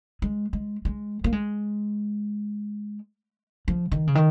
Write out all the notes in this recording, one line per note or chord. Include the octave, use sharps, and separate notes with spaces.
G#3
G#3
G#3
A#3
G#3
F3
D#3
C#3
D#3